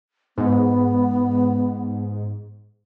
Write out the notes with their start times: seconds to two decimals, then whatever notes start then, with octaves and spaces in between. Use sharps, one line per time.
0.38 G#2 B3